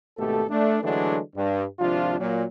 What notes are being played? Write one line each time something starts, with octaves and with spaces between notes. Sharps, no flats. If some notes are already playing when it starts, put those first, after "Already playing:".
G#1 B2 A3 G4 A4
A3 D4
D3 E3 F#3 G#3 A3 D4
G2
G#1 C3 F3 D4 F4
A#2 F#3